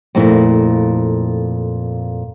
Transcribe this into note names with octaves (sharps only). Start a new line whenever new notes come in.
F2 A#2 A3 E4